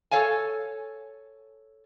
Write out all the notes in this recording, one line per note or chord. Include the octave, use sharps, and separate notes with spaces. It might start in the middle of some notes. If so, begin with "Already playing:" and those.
A4 C#5 F5 G#5